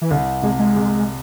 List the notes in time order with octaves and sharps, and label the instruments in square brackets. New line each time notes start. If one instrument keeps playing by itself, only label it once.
[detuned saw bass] E3
[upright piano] C2 [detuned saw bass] D3
[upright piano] C3 [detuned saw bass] G#3
[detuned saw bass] G#3
[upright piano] C3